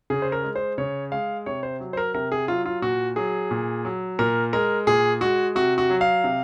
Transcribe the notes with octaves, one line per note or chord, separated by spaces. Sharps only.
C#3 G#4
C5
A#4
G#3
C5
C#3 C#5
G#3 F5
C3 C#5
C5
F#3
C5
A#4
C3 A#4
G#4
F#3 F4
F4
A#2 F#4
F#3 G#4
A#2
F#3
A#2 A#4
G#3 A#4
A#2 G#4
G#3 F#4
C3 F#4
F#4
F#3
F5
C3